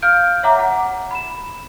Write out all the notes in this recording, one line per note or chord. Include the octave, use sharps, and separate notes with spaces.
F5 F6 G6 D7
C#5 E5 F#5 A#5 D6
F#5
B5 E7